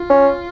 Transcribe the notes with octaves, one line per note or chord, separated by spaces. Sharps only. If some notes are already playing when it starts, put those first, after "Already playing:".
Already playing: F4
C#4